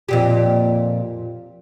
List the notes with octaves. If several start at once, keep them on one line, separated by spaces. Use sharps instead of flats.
F2 A#2 G4